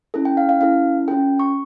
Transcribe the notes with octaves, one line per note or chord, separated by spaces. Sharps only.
C#4 E4 A4
G5
F5
F5
C#4 E4 A4 F5
C#4 F4 A4 G5
C#6